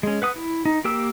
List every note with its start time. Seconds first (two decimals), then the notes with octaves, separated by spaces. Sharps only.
0.03 G#3 C#4
0.22 B4 F#5 D#6
0.36 E4
0.65 D#4
0.84 A#3 G4 A#4 G5 E6